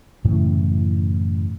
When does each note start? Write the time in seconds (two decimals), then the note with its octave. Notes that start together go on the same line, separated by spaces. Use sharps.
0.25 F#2 A2 C#3 E3